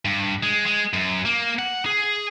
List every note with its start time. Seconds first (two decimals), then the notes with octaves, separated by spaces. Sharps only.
0.05 G2
0.43 G#3
0.66 G#3
0.93 F#2
1.25 A#3
1.59 F#5
1.86 G#4